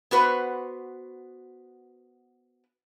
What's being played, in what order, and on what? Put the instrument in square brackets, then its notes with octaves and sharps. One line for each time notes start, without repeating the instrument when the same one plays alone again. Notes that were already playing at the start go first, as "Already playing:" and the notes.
[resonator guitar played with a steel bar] B3 F#4 B4 C5